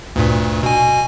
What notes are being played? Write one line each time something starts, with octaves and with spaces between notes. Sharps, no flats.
D2 G2 A#2
B2 G#5